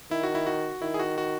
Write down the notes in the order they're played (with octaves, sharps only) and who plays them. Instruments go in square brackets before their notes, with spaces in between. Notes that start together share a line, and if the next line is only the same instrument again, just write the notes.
[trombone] D#3 [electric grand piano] E4
[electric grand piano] F#4
E4
F#4
[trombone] D#3 [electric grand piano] E4
[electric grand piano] G#4
F#4
F#4